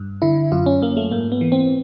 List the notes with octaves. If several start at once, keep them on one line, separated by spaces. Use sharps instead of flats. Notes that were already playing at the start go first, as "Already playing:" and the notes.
Already playing: G2
D3 E4
F#2 F4
C#4
F#2 A#3
A3
G#2 A#3
B3
E3
C4